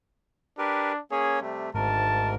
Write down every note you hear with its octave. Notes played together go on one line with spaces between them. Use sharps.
D4 G4 A#4 B4
A#3 C#4 G#4 C#5
C3 G3 A3
G#1 D2 G#2 A#4 A5